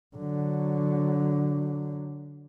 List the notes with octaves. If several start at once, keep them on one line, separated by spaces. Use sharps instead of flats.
D3 F#3